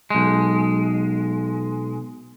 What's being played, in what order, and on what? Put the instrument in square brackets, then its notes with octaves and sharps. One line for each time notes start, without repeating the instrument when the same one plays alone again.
[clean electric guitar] B1 G#3